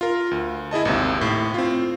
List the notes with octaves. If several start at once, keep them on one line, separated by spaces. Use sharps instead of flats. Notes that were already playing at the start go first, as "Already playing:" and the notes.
F4 A#4
D2
E4 G#4 D#5 A5
G#1 D#2 C3
A2
C4 F4